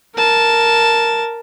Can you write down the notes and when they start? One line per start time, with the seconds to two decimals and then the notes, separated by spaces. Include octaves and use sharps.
0.15 A#4 A5